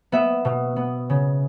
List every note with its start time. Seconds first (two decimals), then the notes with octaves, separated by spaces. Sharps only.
0.12 B3 E5
0.45 B2
0.76 B3
1.10 C#3